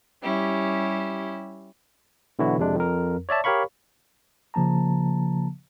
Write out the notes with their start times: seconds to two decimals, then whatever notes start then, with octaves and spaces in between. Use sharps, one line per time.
0.22 G3 C#4 E4 G4
2.39 B2 D3 E3 F#3 E4 F#4
2.59 F2 C3 G#3 D4
2.76 F2 A#4
3.29 C#5 D5 E5 A5
3.44 G4 A#4 C#5 F5 B5 C#6
4.54 C#3 F3 A#3 A5 A#5